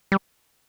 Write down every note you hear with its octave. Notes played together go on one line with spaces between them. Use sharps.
G3